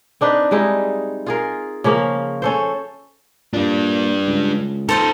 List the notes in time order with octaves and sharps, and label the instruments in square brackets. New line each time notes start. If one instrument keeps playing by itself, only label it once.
[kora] C4 D4 D#4 B4
G3 G#3 D#4 E4
F4 G#4 A#4
C#3 F3 A#3 C#4
C#4 A4 C5
[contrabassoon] A#2 [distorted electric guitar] G3 D4
[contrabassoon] C#2
[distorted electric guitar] D#4 F4 [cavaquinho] A4 C5 A5